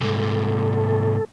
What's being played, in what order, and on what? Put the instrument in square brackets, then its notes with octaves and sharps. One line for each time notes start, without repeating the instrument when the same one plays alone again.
[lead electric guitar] C2 G#2 [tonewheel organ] A4